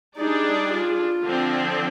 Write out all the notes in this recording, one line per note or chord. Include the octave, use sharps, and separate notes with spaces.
G3 D4 D#4 G#4 D5
F4
D3 F3 C4